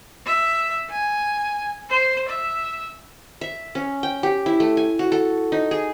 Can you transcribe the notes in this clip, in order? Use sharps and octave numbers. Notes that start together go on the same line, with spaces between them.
E5
G#5
C5
E5
E5
C#4
G5
G4
E4
A3
G#5
F#4
A4
D#4
G#4